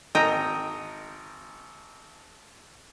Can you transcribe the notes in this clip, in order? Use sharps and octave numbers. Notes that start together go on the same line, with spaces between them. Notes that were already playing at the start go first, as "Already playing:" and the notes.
G#1 D#5 G5 A#5